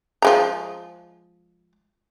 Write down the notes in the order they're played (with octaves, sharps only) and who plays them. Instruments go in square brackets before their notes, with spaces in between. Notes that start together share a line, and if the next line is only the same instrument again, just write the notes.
[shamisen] F3 G#3 A#5